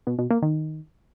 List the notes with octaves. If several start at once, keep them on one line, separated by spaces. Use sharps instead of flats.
B2
B2
A#3
D#3